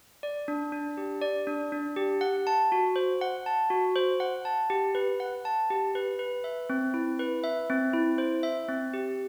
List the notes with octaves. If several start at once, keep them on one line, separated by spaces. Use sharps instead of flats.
D5
D4
D4
G4
D5
D4
D4
G4
F#5
A5
F#4
C5
F#5
A5
F#4
C5
F#5
A5
G4
B4
F#5
A5
G4
B4
B4
E5
C4
E4
B4
E5
C4
E4
C5
E5
C4
G4